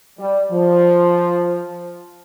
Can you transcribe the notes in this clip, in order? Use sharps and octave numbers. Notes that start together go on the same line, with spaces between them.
G3
F3